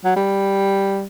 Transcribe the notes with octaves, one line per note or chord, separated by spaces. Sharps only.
F#3
G3